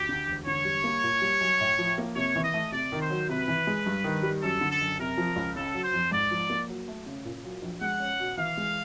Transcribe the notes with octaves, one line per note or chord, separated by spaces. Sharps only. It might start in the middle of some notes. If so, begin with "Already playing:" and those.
Already playing: D2 G4
D3
E1
D3 C#5
G3
A#3
A#2
G3
B1
A2
F3
A#3
C3 C#5
E3
D#5
A3
C3 D5
D#3
C5
F#3
C3 B4
E3
G#3
G2
D#3
G3
F#2 A4
D3
A4
F#1
C3 A#4
F3
C#2
C#3 A4
F#3
C5
F2
G#2 D5
F3
A#3
F#3
A3
C#3
A#2
F#3
A#1
G#3 F#5
C#4
B2
E3 F5
G#3